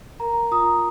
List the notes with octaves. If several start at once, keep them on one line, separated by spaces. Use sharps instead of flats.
A#4 A#5
F4 A#5 D#6